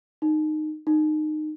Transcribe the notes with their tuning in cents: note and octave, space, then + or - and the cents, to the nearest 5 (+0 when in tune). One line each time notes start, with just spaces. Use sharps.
D#4 -15
D#4 -20